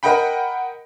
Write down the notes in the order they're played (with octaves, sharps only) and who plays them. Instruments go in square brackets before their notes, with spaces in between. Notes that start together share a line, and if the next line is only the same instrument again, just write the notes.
[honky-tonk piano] A#4 D#5 F#5 G5 B5